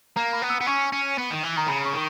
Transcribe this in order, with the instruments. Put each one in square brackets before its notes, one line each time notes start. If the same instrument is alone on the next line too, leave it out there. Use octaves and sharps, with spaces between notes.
[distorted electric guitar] A#3 [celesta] A#5
[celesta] B5
[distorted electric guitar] B3
[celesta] E6
[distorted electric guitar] B3
[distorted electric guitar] C#4 [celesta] C#6
[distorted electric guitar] C#4
B3
D#3
E3
[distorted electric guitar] D#3 [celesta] A#5
[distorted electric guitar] C#3 [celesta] B5
[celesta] C#6
[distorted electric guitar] D#3